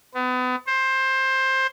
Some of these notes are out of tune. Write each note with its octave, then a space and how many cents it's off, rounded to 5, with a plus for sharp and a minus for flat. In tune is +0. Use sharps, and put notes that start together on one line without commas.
B3 +35
C5 +15